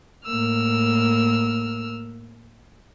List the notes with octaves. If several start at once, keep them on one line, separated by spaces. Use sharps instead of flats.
A2 A#3 A#4 E6 F6